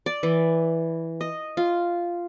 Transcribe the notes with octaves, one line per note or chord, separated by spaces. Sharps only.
D5
E3
D#5
F4